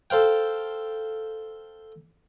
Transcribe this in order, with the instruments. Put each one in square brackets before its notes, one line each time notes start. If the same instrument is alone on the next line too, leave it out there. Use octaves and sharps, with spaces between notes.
[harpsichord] A4 C5 F5 G5